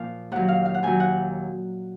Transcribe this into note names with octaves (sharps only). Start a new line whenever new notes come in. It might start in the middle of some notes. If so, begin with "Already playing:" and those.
Already playing: A#2 F3 F5
D#2 D#3 F#3 F#5
F5
F5
F#5
D#2 D#3 F#3 G#5
F#5